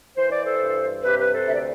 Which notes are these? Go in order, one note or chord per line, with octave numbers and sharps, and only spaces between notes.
E3 C5
D5
A4 C5
G2
C3 G4 B4
B4
A4 C5
D2 E5
D5